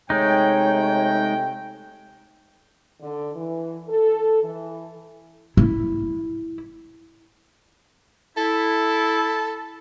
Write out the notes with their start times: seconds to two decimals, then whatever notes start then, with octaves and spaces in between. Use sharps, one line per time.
0.10 C3 G#3 A3 D#4 C#5 G5
3.01 D3
3.35 E3
3.89 A4
4.43 E3
5.57 E4
8.37 E4 A4